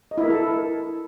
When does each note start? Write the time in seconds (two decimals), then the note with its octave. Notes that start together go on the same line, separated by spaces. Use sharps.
0.11 D#5
0.18 E4
0.24 A#4
0.30 A4